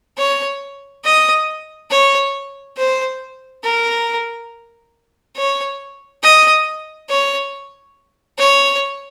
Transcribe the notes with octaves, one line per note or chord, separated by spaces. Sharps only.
C#5
D#5
C#5
C5
A#4
C#5
D#5
C#5
C#5